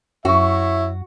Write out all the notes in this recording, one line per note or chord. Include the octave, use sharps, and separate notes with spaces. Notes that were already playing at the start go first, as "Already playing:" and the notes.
F#2 E4 F#4 C#5 E5